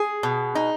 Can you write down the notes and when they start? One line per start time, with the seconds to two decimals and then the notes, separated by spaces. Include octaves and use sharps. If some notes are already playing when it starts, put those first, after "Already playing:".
Already playing: G#4
0.23 B2
0.55 D#4